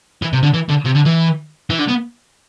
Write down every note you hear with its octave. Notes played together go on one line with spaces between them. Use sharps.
E3
C3
D3
E3
D3
C3
D3
E3
E3
D3
B3